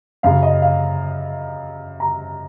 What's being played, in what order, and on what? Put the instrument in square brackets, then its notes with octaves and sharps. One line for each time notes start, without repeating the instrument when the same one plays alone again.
[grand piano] F#2 C#3 F#3 F5
D#5
F5
A#5